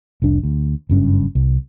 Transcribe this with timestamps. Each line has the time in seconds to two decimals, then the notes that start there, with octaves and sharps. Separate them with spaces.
0.22 F1 C2 D4
0.43 D2
0.89 F#1 G2 C#4
1.35 C2